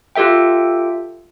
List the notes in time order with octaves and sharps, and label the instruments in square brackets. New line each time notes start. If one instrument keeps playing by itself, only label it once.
[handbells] F4 G4 A4 E5 G5